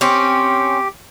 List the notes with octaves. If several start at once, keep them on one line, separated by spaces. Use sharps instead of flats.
C4 C#4 G4